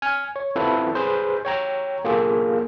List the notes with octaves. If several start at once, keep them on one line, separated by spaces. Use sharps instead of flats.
G#5 F6
C#5
C4 E4 F4 A4 B4
G#4 B4 C5
C#5 G5 A#5
A#3 F4 G#4 A4